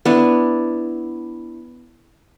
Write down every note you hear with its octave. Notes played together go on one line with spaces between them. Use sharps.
B3 D4 E4